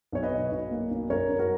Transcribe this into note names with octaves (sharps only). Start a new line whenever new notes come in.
B1 C#5
B4 D#5
B2
B1
A#3
B1
F#2 A#4 C#5
F#2
F#4 A#4